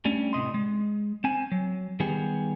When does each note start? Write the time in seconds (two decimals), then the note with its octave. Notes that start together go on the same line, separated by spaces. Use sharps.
0.05 G3 A3 C#4 D4
0.33 A2 C3 D#5 C6
0.54 G#3
1.24 C4 G#5
1.52 F#3
2.00 D#3 G3 B3 G4 G#4